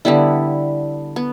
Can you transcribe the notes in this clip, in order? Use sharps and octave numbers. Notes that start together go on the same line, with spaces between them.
D3 G3 B3 E4
B3